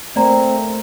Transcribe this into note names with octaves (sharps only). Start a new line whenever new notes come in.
A3 A#3 C4 D5 A#5